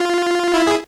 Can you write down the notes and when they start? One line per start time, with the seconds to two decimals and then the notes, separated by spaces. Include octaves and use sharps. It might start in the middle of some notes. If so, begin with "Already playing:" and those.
Already playing: F4
0.54 E4
0.67 G#4